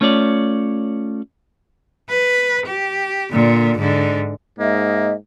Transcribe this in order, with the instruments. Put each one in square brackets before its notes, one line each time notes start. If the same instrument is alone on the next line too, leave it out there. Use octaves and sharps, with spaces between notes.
[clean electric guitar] A3 C#4 F4 C#5 D5
[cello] B4
G4
A#2 D3
G#2 D3
[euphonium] G#2 [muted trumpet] A#3 [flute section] D#5 E5